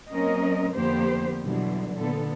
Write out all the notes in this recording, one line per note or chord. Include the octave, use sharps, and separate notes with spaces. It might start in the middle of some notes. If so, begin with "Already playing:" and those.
F#3 A#3 C4 C#4 A#4 D#5
F2 D3 A#3 B3 G4 C5
B2 D3 E3 F#3 G3
A#2 D3 B3 A4